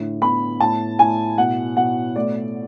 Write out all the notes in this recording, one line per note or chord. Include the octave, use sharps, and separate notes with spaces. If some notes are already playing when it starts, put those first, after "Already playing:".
Already playing: A2 D3
B3 B5
A2 A5
A2 G#5
B2 F#5
B2 F#5
A3 D5